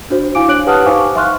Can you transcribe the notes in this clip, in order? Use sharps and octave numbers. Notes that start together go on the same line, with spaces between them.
D4 F#4 C5
E4 F5 G#5 D6 D7
D4 C#5 F#6 D7 F#7
G4 B4 F#5 A5 D#6 F6
D#4 C5 F5 G#5 C#6 D6
E5 F5 C6 C#6 F6 F#6